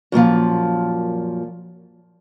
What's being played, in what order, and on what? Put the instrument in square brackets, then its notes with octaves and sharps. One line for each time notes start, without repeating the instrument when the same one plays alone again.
[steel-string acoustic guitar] F#2 A#2 D#3 F3